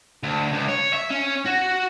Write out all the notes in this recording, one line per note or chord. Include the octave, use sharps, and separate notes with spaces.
D2
C#2
C#5
E5
C#4
F#4